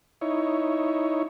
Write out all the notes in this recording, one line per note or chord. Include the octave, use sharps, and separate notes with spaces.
D#4 E4 C#5